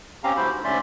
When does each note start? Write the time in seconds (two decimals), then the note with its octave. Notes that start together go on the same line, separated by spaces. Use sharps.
0.24 C4 C#4 G4 F5 A#5
0.37 D2 G2 E4 F#4 C5 B5
0.53 G#2
0.64 D2 G#2 C#4 D5 E5 C6